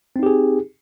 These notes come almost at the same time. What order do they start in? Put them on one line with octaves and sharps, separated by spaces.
C4 D#4 G4 G#4